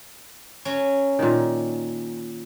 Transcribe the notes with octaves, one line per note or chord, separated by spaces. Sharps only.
F#3 C#4
A#2 D#3